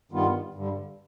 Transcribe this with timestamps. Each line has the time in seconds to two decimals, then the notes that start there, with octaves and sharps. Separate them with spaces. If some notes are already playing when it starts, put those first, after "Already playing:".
0.12 G2 D#3 G3 B3 F4
0.54 G2 D3 G3